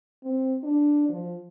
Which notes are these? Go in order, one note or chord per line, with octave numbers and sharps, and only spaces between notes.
C4
D4
F3